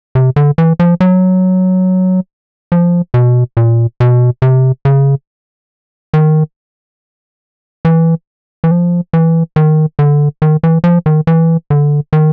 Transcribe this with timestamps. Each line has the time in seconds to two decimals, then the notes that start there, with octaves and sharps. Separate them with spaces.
0.15 C3
0.36 D3
0.58 E3
0.80 F3
1.00 F#3
2.72 F3
3.14 B2
3.57 A#2
4.00 B2
4.42 C3
4.85 C#3
6.14 D#3
7.85 E3
8.64 E3
8.71 F3
9.13 E3
9.56 D#3
9.99 D3
10.42 D#3
10.63 E3
10.84 F3
11.06 D#3
11.27 E3
11.70 D3
12.13 D#3